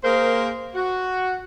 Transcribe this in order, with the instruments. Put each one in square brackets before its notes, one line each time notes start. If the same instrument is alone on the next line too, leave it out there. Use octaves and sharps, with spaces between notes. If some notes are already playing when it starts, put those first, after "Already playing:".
[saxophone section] A#3 G#4 A#4 C5
F#4